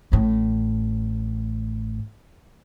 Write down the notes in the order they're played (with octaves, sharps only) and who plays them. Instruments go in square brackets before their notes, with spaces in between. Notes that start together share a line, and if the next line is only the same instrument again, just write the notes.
[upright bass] A1 A2